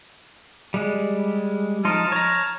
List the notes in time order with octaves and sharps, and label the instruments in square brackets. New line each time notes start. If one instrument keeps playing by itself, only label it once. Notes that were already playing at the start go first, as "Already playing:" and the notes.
[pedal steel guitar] G3 G#3
[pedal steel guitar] F3 D#4 C6 [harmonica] A5 F6
[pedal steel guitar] C#5 A#5